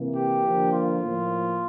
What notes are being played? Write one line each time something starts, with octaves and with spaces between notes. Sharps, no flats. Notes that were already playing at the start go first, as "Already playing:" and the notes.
Already playing: C3 E3 A#3
G4
D3 F3 A#3
F4
A2 F3 A#3